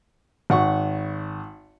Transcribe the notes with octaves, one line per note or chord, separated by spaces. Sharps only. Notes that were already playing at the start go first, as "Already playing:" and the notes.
G#1 F#5 C#6